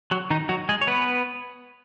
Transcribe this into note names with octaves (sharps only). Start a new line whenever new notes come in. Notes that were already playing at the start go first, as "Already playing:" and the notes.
F#3 F#4
D#3 D#4
F#3 F#4
G#3 G#4
C#5
B3 B4